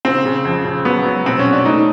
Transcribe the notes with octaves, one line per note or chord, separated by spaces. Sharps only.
C#3 C4
C#3
F2
C#3
F#3 B3
F#3
B2 C4
C#4
B2
D4
A3 D#4